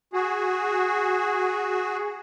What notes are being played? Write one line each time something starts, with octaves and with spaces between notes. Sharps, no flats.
F#4 G#4